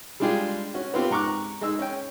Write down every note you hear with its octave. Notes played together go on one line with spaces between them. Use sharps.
G3 G#3 D4 F4 G4 G#4
C#4 F#4
B3 C4 F4 G4
G#2 A#5 C#6 D6 F#6
G#3 D#4 E6
C#4 G5